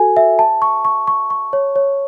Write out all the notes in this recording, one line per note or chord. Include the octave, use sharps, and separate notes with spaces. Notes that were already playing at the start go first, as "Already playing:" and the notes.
Already playing: F#4 A4 G#5
E5
A5
C#6
C#6
C#6
C#6
C#5
C#5